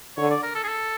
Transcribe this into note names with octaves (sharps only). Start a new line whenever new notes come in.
D3 C#5
D5
A#4
A4
G#4
A4